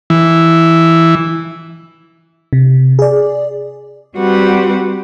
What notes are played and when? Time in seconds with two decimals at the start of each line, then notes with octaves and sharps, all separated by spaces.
0.10 E3
2.53 C3
2.99 G#4 D5
4.18 G3 C4 F#4 G4 B4 F#5